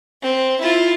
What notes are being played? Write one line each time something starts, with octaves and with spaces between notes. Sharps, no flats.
C4
E4 F4